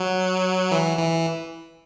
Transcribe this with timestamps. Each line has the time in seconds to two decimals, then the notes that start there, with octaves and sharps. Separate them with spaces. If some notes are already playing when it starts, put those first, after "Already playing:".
Already playing: F#3
0.71 E3
0.98 E3